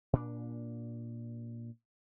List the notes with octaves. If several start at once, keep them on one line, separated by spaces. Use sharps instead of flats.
A#2 D4